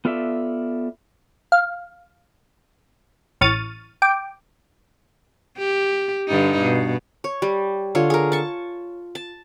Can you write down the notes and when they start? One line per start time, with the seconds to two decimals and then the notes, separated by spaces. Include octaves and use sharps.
0.05 B3 F4 A4 D5 E5
1.52 F5
3.41 A1 C#6 F6 A6 D#7
4.02 G5 D6
5.58 G4
6.29 G2 D3 D#4
6.62 B2
7.24 C#5
7.42 G3
7.95 D3 F4 C#5
8.10 G#4 A#4
8.32 A5 C#6
9.15 A5